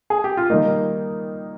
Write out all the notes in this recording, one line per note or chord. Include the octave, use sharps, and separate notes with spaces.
G#4
G4
F4
D#3 G3 A#3 D#4